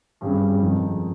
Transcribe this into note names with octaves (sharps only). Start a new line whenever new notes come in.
G#1 G2 G3 C#4 G#4
F2 D#3 G#3 D#4